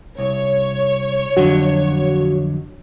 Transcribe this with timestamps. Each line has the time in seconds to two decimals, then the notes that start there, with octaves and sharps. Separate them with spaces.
0.18 C2 C#5
1.37 F2 D3 F#3 F#4